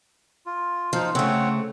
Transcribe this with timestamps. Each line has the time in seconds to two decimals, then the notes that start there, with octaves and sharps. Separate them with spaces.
0.46 F4
0.93 F3 D#4 F5
1.15 C#3 A3 C4 C#5 F#5